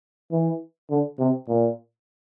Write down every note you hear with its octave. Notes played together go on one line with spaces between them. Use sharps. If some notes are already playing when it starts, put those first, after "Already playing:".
E3
D3
C3
A#2